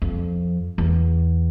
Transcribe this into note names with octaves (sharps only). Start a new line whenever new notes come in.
F2
E2